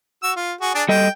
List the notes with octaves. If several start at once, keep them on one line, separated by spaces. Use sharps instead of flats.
F#4 E6
F4
F#4 G#4
D4 G#4 D5
G3 A4 D#5 G5